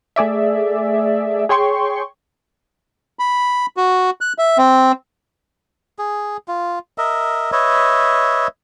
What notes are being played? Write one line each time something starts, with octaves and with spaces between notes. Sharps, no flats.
A3 G#4 D5 E5
G#4 C#5 G5 C6 C#6
B5
F#4
F#6
E5
C4
G#4
F4
A#4 D#5 E5
B4 C#5 D#5 E5